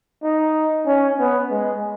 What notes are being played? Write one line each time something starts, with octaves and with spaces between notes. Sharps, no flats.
D#4
C#4
B3
G#3